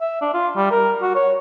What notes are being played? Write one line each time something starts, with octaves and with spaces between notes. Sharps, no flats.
E5
D4
F4
G3
A#4
F#4
C#5